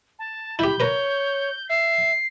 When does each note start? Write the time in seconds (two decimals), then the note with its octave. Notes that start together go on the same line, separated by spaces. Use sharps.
0.19 A5
0.59 E4 G4 B5 G6
0.80 A#4 B4 C#5
1.69 E5 C7